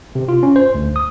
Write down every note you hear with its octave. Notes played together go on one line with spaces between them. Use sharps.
C3
F4
C#4
C5
D2
D#6